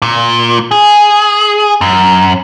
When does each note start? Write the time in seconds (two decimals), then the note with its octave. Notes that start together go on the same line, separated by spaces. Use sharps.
0.02 A#2
0.71 G#4
1.81 F#2